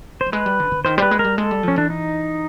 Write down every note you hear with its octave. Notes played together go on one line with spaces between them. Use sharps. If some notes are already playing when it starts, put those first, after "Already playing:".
C5
G3
G#3 B4
G3
D3
D3
D#3 C5
G3 B4 C5
G#3
A#4
G3
G#3 A4
G3
F3 C#4
E3 D4
D#4